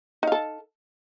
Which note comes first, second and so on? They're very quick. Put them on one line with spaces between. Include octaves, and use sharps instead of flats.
D#4 F5 A4